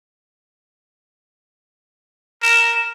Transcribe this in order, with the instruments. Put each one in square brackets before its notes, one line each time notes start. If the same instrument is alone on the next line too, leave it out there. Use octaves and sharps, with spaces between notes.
[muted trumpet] A#4 [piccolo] E7